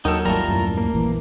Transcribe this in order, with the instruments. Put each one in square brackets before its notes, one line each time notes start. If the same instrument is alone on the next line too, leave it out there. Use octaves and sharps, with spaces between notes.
[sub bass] D#2 [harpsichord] F#3 A#4 G5 [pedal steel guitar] D#4 A4
[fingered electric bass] G#1 F#3 [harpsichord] G3 A3 [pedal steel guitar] F4 A#4 A#5
[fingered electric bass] F#2 A2
[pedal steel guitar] A#3
[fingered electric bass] A#1 E3